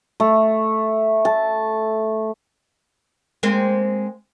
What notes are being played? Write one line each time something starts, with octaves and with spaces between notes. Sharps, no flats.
A3
A5
G#3 A#3 C4